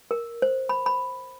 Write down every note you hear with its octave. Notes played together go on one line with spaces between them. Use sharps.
A#4
C5
B5
B5